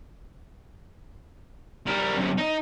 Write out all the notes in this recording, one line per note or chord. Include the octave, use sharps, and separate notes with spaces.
G3 A#4
F#2 C3
D#4